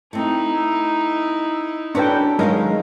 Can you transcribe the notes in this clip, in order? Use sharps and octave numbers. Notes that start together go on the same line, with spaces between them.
A3 C4 D#4 E4
C#4 D4 F#4 A4 B4 G5
F#2 D#3 G#3 C#4 F4 A#4